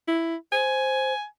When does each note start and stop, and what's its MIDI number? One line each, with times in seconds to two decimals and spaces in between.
0.08 0.35 64
0.52 1.13 72
0.52 1.25 80